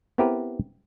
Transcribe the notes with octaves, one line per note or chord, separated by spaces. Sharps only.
B3 C4 E4 G4 A#4 B4